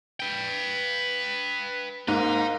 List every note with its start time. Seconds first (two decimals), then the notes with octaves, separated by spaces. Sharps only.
0.20 B4 G5
2.08 G#2 A#3 D#4